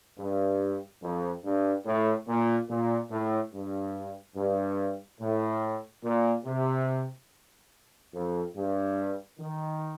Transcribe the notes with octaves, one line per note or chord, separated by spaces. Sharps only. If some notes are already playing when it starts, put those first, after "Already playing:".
G2
F2
G2
A2
A#2
A#2
A2
G2
G2
A2
A#2
C3
F2
G2
D#3